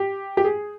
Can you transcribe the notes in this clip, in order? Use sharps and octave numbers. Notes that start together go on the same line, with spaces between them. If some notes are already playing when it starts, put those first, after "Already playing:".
Already playing: G4
G4
G#4